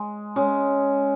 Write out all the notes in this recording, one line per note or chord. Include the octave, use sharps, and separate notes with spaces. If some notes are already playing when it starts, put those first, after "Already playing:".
Already playing: G#3
G#3 C#4